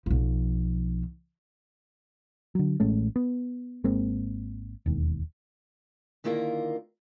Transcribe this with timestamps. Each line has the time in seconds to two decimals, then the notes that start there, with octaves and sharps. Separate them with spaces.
0.06 B1 F3
2.55 D3 F#3
2.80 A1 G#3 A3 C#4
3.16 B3
3.84 G#1 G#3 A#3 C4
4.86 E1 D#2
6.24 D3 D#3 A#3 E4 F4 A#4